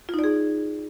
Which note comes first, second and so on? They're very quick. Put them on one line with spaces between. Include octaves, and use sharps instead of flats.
F4 D#4 D5 G#4